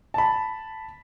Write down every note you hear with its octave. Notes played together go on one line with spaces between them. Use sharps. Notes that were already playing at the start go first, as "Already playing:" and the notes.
A5 B5